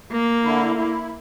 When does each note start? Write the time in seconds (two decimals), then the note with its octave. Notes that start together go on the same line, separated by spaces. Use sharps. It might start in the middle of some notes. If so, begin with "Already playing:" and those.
0.12 A#3
0.44 D3 E4
0.75 E4